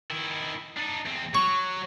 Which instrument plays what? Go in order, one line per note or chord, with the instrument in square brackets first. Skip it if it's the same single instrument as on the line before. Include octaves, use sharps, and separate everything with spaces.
[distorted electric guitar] D#3 E4
D4 D#4
E2 C4
[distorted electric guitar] F#3 [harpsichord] C#6